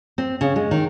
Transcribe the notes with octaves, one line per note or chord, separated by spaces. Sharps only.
C4
C#3
G#3
D#3